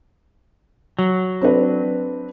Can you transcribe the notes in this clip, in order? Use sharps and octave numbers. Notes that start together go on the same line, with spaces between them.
F#3
C4 D4 B4